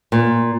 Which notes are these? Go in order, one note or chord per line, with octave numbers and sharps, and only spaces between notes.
A#2